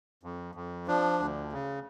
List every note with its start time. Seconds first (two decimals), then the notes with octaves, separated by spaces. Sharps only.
0.23 F2
0.55 F2
0.87 F3 D4
1.20 D2
1.52 C#3